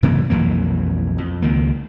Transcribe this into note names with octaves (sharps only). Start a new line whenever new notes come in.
F#2 C3 E3 A#3
B1 F2 E3 A#3
F2
C#2 D#3 A#3